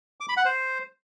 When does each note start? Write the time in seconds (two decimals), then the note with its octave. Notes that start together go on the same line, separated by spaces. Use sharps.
0.20 D6
0.29 B5
0.37 F#5
0.45 C5